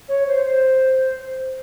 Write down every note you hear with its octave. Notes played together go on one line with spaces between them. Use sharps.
C#5
C5
C5